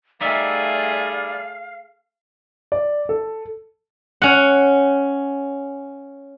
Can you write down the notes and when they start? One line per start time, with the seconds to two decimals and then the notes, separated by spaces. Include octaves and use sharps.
0.21 G3 A3 D#4 G#4 D5 E5 F5
2.72 D5
3.09 A4
4.22 C#4 F#5